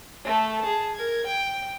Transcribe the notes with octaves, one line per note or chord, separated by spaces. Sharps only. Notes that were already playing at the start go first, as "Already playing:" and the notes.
A3 A4
G#4 A5
A#4 G#6
G5